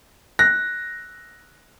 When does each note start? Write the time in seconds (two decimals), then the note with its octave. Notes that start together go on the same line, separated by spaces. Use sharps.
0.39 F#6 A#6